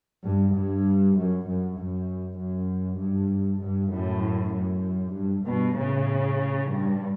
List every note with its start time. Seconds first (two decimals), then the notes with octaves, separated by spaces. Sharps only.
0.24 G2
0.54 G2
1.16 F#2
1.47 F#2
1.77 F#2
2.38 F#2
2.99 G2
3.61 G2
3.91 F#2 A2
4.53 F#2
5.13 G2
5.44 G2 B2
5.75 A2 C#3
6.67 G2